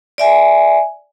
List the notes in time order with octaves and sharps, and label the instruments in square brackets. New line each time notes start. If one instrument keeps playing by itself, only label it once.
[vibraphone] D5 E5 G#5